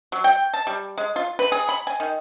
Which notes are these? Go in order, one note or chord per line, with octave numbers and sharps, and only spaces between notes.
F#3
G5
A5
G3
G#3
F4
B4
G#4
B5
G#5
D#3